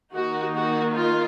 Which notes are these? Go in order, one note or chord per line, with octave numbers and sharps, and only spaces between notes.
D#3 A#3 D#4 F#4
F#4
F4